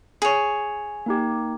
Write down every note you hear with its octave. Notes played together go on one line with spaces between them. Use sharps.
G#4 C#5
A#3 D#4 G4